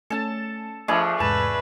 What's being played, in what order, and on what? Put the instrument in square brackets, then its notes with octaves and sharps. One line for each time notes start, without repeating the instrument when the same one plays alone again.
[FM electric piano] A3 C#4 [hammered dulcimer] A4 A5
[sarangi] F3 [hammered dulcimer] A3 D4 G#4 [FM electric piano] D#5 B5
[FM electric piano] E2 G#2 C3 [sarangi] B4 [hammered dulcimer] A5